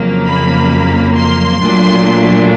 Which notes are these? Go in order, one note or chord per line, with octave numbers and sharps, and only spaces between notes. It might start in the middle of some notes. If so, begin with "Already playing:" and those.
Already playing: F2 C#3 F#3 A#3
B5
C6
A#2 F#3 A3 D4